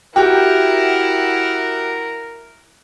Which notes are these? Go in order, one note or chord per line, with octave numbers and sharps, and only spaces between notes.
E4 F#4 G4 A#4 F#5 G5